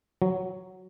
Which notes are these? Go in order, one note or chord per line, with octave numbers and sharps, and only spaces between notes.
F#3